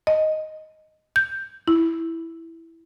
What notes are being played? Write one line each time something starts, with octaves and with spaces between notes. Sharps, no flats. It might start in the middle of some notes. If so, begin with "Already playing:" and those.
D#5
G6
E4